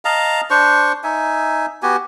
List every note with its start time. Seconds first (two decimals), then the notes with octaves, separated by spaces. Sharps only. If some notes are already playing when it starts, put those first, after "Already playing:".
0.05 D#5 F5 A5 A#5
0.50 D4 C5 C#6
1.04 D#4 E5 G#5
1.83 B3 F#4 G4 G#5